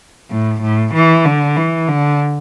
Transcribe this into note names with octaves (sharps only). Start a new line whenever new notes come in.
A2
A2
E3
D3
E3
D3